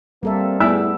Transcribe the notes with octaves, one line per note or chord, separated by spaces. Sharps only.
G3 A#3 C4 A4 E5
A3 B3 E4 G#4 D5 E5 E6